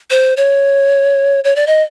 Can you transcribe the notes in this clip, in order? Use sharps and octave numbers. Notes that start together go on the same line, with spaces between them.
C5
C#5
C#5
D5
D#5